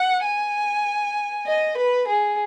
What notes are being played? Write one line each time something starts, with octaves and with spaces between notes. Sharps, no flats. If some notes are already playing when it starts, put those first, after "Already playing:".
Already playing: F#5
G#5
D#5
B4
G#4